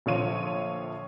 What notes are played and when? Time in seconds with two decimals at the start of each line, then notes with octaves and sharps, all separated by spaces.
0.06 A#1 D3 F3 C#5 F5 D#7